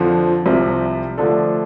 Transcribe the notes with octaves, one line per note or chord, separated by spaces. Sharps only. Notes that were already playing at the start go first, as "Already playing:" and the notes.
Already playing: F2 D3 F3
C2 C3 F3 C4
D3 F3 A3 D4 A4